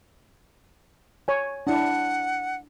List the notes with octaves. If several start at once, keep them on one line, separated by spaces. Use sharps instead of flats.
C#5 G#5
D4 E4 F#5